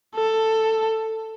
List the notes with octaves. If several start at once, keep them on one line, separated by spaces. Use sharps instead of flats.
A4